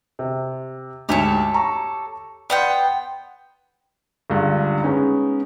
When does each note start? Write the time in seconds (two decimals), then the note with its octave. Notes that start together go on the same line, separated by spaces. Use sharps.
0.19 C3
1.09 D2 G#2 G4 A4 C#5
1.54 A#5 C#6
2.50 B3 D5 F#5 G5 C6
4.30 C#2 G2 D3
4.83 G#3 B3 C#4 D#4